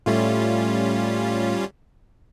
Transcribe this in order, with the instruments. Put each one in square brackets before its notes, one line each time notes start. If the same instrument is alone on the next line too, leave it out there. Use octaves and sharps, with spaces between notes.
[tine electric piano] A2 A3 [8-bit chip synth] G3 C#4 F4